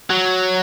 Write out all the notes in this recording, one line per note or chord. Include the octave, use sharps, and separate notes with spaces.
F#3